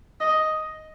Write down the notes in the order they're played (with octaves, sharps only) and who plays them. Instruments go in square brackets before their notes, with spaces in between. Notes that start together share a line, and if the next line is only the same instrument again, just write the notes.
[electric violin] D#5